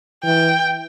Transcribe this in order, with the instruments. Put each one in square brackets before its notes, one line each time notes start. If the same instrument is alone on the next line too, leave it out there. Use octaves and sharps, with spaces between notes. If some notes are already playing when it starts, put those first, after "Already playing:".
[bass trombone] E3 [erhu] G5